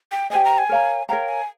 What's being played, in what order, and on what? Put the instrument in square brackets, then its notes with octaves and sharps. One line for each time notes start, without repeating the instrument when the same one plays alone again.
[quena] G5
[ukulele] G4 C5 D#5 [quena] G#5
[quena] A#5
G#5
[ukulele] A#4 C#5 F5 A#5
[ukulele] A#4 C#5 F5 A#5 [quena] G5
[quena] G#5